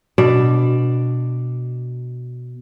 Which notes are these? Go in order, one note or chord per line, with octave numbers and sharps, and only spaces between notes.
B2 D4 D5